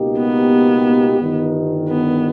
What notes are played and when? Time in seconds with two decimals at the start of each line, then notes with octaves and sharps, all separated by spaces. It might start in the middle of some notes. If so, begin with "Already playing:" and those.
Already playing: C#2 B2 A#3 D#4 G4
0.18 B3
1.20 G1 G2 D#3
1.89 B3